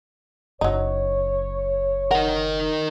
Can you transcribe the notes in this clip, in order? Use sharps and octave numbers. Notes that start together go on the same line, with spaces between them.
F#1 F#3 D#4 C#5
A#4 D#5 F#5